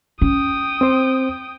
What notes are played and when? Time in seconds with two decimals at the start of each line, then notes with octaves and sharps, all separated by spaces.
0.22 C#4 G5 D#6
0.81 C4 C5